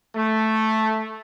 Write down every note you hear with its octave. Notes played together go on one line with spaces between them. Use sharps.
A3